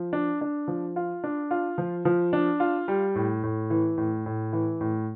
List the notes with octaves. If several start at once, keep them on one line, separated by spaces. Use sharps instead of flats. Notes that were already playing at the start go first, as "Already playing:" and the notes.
Already playing: F3
D4
D4
F3
F4
D4
F4
F3
F3
D4
F4
G3
A2
A2
E3
A2
A2
E3
A2